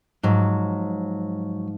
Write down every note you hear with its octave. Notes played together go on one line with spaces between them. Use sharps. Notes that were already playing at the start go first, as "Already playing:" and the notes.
G#2 F3 F#3